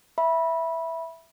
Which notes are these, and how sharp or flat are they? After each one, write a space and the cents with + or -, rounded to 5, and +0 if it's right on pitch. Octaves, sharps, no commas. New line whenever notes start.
E5 +0 B5 -20